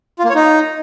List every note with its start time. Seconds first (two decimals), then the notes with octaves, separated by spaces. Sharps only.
0.19 F4
0.24 A#3
0.30 C#5
0.35 D#4